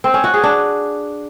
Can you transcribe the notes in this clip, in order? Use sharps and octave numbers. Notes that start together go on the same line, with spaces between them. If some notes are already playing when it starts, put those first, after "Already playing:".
C4
C#4
F#4
G#4
D4